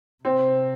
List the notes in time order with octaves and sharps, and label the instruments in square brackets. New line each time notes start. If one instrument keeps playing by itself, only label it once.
[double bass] C3 [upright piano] C4